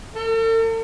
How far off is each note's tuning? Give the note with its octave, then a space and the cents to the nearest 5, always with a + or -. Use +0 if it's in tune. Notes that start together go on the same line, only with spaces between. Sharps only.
A4 +45